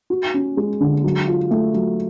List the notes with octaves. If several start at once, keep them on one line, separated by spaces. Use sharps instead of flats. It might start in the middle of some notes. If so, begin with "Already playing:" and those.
F#4
C#4
G#3
D3
F#3
F4
A3
F#3